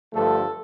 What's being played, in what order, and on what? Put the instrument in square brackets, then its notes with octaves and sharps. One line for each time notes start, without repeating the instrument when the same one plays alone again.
[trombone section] G2 D3 F3 A3 A4